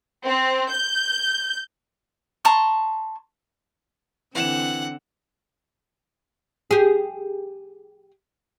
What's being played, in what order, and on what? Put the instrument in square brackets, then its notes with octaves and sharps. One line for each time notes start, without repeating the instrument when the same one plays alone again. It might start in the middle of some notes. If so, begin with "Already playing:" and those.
[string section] C4
G6
[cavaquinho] A5 A#5 C6 C#6
[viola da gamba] D3 C4 [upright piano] E3 E7 [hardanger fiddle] F#5
[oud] G4 G#4